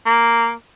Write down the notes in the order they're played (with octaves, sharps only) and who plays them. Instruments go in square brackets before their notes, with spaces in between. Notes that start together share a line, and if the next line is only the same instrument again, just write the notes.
[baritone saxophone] A#3